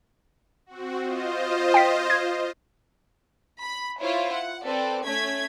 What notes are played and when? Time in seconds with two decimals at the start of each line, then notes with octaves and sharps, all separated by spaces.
0.66 C4 F#4
1.00 F4 C5 D#5
1.74 G5 B6
2.10 G#6
3.62 B5
4.00 E4 F4 C5 C#5
4.31 F#5
4.65 C4 A4 B4 D5
5.06 A3 C#4 G#6 B6